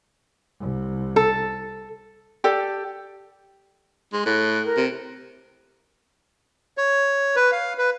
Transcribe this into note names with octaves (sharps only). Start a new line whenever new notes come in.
C2 C3
A4
G4 A4 D5
G#3 C6
A2 F#6
A#4
C3
C#5
B4
F5
B4